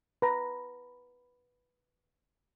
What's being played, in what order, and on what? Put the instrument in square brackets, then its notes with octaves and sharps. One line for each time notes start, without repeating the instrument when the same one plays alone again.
[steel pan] B4 A#5